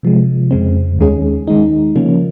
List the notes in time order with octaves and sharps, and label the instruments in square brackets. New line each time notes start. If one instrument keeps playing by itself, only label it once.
[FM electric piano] C3 F3 G#3
F2 C#3 G#3 C4
D#2 D#3 G#3 C#4 G#4
D#3 G#3 D#4
C#3 F3 A#3 C#4